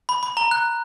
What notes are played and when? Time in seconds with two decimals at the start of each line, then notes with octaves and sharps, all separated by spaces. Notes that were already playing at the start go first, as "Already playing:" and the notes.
0.09 B5
0.23 B5
0.37 A#5
0.51 F#6